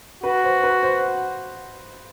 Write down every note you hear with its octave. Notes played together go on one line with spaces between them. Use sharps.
F#4 B4
C5
B4
C5